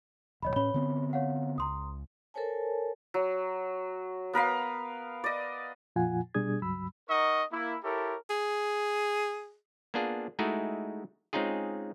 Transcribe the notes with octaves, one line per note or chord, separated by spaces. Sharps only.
D#1 B1 C#5 D#5 B5
A2 C#4 C#5 B5 G7
D3 B3 C4
C#5 F5 F#5
C#2 A#5 C6 D#6
A4 A#4 C5 C#5 G#5 A5
F#3
B3 A#4 B4 F5
D5 D#5
F2 A#2 F3 F4 F#5 G#5
B2 G3 D4 G#4 D#6 G#6
C#2 G2 F#3 B5 E6
D#4 A#4 D#5 F#5 C#6
A#3 E4
E4 G4 A4 A#4 C#5
G#4
A#3 B3 D4 F4 G#4
G#3 A3 D#4 E4 F#4 G#4
G#3 C4 C#4 D#4 F4 G#4